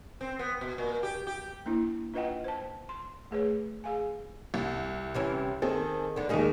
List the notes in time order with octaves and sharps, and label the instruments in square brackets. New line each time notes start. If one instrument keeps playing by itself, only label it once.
[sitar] C4
B3
B2
A#2
G4
G4
[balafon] A#3 D4 E4
D4 F4 B4 D#5 F#5 G5
C5 A5
C6
A3 G#4 B4 C#5
G#4 F5 G#5
[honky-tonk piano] C2
[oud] C3 E3 C#4
[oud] D#3 [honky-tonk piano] C4 G#4 A4
[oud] D3 B3
[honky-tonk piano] D#2 G#3 [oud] A#3 D#4 G#4